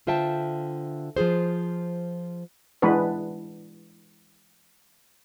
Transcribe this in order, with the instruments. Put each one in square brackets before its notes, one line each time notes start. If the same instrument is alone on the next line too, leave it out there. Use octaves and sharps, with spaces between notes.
[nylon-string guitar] D3 F4 C5 E5 G5 A5
F3 F4 G#4 C5
[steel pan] E3 G#3 B3 D4 B4